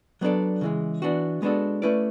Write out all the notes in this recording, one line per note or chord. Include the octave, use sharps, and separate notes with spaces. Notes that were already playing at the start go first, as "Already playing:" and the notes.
F#3 B3 D4 A4 D5
C#3 E3 G#3
E3 B3 D4 F#4
G#3 B3 D4 F#4 A4
A3 C#4 E4 B4 D5